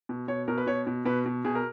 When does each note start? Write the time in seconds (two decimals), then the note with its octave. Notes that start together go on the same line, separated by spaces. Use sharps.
0.09 B2
0.28 B2 C#5
0.48 B2 A#4
0.58 B4
0.67 B2 C#5
0.87 B2
1.05 B2 B4
1.26 B2
1.45 B2 G#4
1.55 A#4